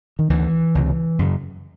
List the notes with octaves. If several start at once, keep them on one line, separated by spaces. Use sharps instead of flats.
D#3
D2 D3 E3
C#2 C3
F#2 C#3